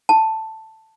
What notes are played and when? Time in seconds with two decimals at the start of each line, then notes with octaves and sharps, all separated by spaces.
0.09 A5